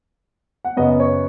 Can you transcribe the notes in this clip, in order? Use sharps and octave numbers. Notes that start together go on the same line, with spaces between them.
F#5
F#2 C#3 B3 D#5
C#5